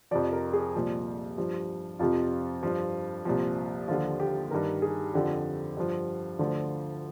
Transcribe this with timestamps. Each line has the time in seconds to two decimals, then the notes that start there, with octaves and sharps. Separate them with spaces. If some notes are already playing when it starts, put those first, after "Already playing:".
0.11 F2 C3 F3 D5
0.33 A#4
0.53 G#4
0.75 C2 A#2 F3
1.38 G2 F3
1.99 F2 C3 F3 F4
2.63 G2 F3
3.25 C2 A#2 F3
3.88 D#2 D3 F3 F4
4.20 G4
4.51 G2 D#3 A#4
4.82 G#4
5.14 F2 D3 F3 G4
5.77 G2 F3
6.39 D2 D3 F3 F4